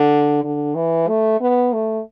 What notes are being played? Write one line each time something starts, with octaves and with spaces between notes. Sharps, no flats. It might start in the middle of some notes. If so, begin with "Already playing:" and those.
Already playing: D3
D3
E3
A3
B3
A3